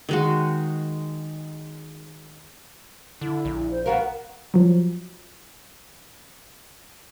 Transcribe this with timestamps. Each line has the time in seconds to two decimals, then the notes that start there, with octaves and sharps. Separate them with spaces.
0.09 D#3 G#3 F#4
3.21 D3 E4
3.45 A#1
3.71 C5
3.86 B3 F#4 A#4 F5
4.54 F3 F#3